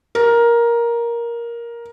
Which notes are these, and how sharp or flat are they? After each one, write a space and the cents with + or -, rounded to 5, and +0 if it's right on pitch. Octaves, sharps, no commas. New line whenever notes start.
A#4 +10